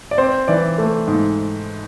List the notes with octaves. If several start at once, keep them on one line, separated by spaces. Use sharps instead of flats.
D5
C4 C5
E3 D5
A3
G#2